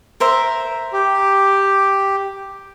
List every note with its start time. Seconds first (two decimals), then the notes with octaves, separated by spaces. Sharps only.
0.20 A#4 C5 E5
0.93 G4